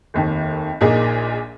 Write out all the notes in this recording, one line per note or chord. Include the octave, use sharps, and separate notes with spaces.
F1 D#2 D#3
A#1 A#2 A#3 D#4 G#4